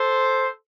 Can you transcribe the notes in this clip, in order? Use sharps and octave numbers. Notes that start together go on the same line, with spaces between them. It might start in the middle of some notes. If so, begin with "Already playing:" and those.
Already playing: A4 C5